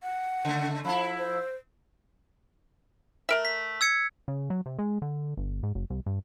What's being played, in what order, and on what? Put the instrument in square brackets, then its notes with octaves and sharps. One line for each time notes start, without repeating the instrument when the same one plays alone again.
[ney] F#5
[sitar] C#3 A3
[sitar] F3 E4 [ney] B5
[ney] C5
[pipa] A3 A#4 E5
[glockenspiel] B6
E6 G#6 C#7
[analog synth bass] C#3
F#3
C3
G#3
D3
G1
G#2
F#1
C2
G2